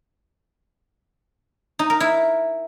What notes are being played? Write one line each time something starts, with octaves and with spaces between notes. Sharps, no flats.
D#4
A#4
E4